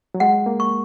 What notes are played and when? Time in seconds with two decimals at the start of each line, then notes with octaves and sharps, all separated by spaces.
0.14 F#3
0.20 G#3 F#5
0.46 A#3
0.60 C#6